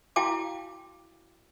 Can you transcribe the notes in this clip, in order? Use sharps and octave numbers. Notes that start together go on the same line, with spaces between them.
E4 F#4 F5 G5 A5 D6